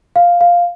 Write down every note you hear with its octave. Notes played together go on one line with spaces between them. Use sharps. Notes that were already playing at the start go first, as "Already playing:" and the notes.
F5
F5